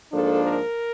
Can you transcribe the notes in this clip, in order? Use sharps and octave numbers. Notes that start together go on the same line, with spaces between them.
G#2 F3 A#3 D4 A4
A#4